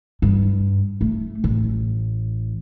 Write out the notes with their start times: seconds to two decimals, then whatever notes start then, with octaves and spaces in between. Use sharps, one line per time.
0.22 G2
1.01 A3
1.44 A1